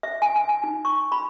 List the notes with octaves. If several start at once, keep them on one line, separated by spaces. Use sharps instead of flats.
E5
G#5
G#5
G#5
D#4
C#6
B5